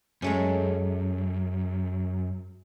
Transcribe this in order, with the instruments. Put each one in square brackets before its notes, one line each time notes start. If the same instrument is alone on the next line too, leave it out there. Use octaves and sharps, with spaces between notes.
[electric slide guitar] F#2 [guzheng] G#3 A3 C#4